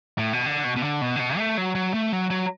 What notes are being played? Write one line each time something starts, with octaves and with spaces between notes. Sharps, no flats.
A2
B2
D3
B2
B2
D3
B2
D3
B2
A3
F#3
F#3
A3
F#3
F#3